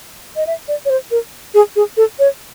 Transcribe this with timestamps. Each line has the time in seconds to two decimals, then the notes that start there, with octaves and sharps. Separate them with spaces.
0.36 D#5
0.47 E5
0.68 D5
0.85 C#5
0.90 C5
1.11 A#4
1.54 G#4
1.76 G#4
1.97 A4
2.19 C#5